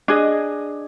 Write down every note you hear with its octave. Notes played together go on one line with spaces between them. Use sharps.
D4 G#4 D#5